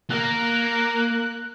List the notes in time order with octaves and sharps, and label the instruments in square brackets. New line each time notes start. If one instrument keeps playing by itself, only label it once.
[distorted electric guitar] A#3 [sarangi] A#4 [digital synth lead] F#6